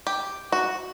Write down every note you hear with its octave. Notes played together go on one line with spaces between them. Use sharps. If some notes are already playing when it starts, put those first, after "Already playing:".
G4
F#4